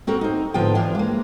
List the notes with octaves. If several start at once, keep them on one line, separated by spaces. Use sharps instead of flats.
C4 F#4 A4 A#4
C4 D#4
G#2 D3 F3 B3 F4 G5
E3 F3 D4 F4
G#3 A#3